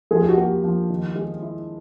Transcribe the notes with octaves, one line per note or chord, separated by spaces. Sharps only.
F3 G#4
G4
F#4
A#3 G4
F3
D#3
G#3
E4